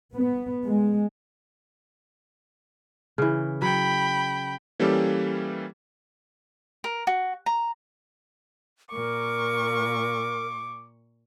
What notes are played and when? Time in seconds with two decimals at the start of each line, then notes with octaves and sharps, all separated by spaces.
0.13 B3
0.65 G#3
3.18 C#3 E3
3.62 F#3 G5 B5
4.80 E3 G3 A#3 C#4 G4 A4
6.84 A#4
7.07 F#4
7.46 A#5
8.91 A#2 A#4 C#6 D6